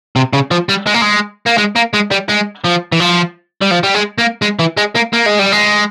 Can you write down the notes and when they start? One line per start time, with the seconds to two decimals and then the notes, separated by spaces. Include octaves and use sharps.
0.16 C3
0.33 C#3
0.51 F3
0.69 G3
0.87 G#3
0.94 A#3
1.02 G#3
1.47 A#3
1.58 G#3
1.76 A#3
1.94 G#3
2.11 G3
2.29 G#3
2.64 F3
2.92 E3
3.00 F3
3.61 G3
3.71 F3
3.83 G3
3.94 G#3
4.18 A#3
4.42 G#3
4.59 E3
4.77 G#3
4.95 A#3
5.13 A#3
5.26 G#3
5.39 G3
5.52 G#3